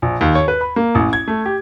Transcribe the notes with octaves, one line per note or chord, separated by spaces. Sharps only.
A#1
D#2
C#5
B4
B5
A#3
A1
G#6
A3
G4